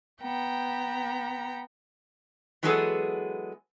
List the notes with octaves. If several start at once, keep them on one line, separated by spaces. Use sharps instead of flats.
B3 G5 A#5
E3 F#3 G#3 B3 G#4 A4